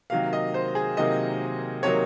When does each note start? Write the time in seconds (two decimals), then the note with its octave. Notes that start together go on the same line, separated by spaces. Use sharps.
0.10 C3 D#3 F#3 A#3 F5
0.33 D#5
0.54 C5
0.75 G#4
0.97 C3 D#3 F#3 A#3 D#5
1.83 C3 D#3 F#3 A#3 C#5